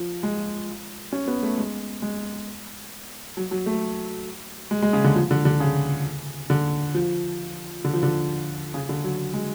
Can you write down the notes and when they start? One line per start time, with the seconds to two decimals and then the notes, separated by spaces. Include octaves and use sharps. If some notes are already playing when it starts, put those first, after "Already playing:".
Already playing: F3
0.23 G#3
1.13 C#4
1.28 B3
1.43 A3
1.58 G#3
2.02 G#3
3.37 F#3
3.51 F#3
3.66 A3
4.71 G#3
4.82 G#3
4.93 C#3
5.04 D3
5.15 F3
5.31 D3
5.45 D3
5.60 C#3
6.50 D3
6.95 F3
7.84 D3
7.93 F3
8.03 D3
8.74 C#3
8.89 D3
9.04 F#3
9.34 G#3